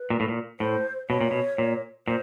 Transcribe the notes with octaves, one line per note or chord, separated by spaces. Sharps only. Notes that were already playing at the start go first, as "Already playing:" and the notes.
Already playing: B4
A#2
A2
A#2
A2 C5
B2 C#5
A#2
B2
A#2
A#2 C5